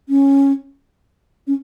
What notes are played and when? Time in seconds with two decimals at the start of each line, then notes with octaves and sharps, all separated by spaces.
0.09 C#4
1.47 C#4